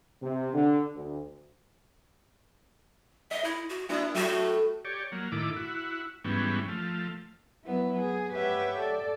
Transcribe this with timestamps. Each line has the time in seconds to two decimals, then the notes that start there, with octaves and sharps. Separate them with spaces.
0.22 C3
0.54 D3
0.95 D2
3.31 D#5 E5
3.44 E4
3.69 F#4
3.89 A#3 D4 E4 F#4
4.14 A2 F#3 A3 F#4
4.85 G4 C#5 D5
5.12 F#3 A#3
5.32 A2 D#3 E4 D6
5.56 E4 F#4
6.24 G#2 E3 G3 B3 C#4
6.68 F3 A3
7.64 F#3 B3 E4
8.00 G#4
8.33 G4 B4 C#5 E5 F#5 G5
8.79 A4 D5